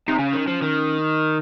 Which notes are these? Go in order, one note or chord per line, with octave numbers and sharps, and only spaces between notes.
C3 D#4
C#3 C#4
D#3
F3
D#3